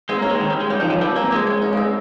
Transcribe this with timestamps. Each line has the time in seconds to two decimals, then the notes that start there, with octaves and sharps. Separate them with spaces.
0.09 G#3 C4
0.19 A#3 C#4
0.30 G#3
0.35 C4
0.40 D#3
0.50 G3
0.60 G#3
0.70 G3 C#4
0.80 F3 D#4
0.90 F3 C#4
1.01 G3 C4
1.15 A#3 C4
1.31 G#3 C4
1.47 C#4
1.62 C#4
1.73 A#3
1.77 C4